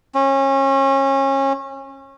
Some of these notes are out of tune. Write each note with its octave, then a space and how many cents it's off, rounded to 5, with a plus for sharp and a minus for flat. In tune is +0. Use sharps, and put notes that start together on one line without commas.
C#4 -30